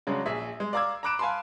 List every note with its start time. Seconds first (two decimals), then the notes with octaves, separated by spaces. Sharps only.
0.07 C#3 F#3 G#3 D4
0.26 A#1 G#4 E5
0.60 G#3
0.73 D5 F5 A#5 D6 E6 G#6
1.03 A#5 B5 D6 F#6 D7 E7
1.19 F5 G#5 A5 B5 C6